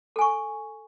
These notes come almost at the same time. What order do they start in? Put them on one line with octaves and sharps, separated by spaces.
A4 G#5 C#6